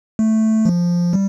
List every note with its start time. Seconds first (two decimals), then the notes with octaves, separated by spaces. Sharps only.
0.19 A3
0.65 F3
1.13 G3